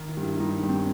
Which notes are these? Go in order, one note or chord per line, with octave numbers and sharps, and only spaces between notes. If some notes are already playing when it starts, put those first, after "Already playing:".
Already playing: D#3
E4
G2
E4
G2 D#4
G2
C4
C#4